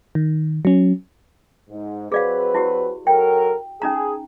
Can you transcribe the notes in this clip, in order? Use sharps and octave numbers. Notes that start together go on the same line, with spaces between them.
D#3
F#3 C#4
G#2
F#3 C4 G#4 B4 D5 F5
E4 F#4 G4
F#3 A4 A#4 G5
C#4 D#4 G#4 A#5